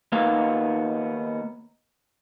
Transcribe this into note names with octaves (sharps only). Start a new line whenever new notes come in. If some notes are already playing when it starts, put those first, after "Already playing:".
D#3 A#3 B3 F5